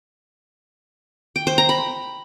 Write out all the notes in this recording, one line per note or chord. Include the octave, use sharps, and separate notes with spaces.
G5
C5
A#5
B5